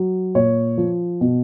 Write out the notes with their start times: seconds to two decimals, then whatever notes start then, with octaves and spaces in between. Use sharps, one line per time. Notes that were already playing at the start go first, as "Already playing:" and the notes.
Already playing: F#3
0.35 A#2 C#5
0.78 F3
1.21 B2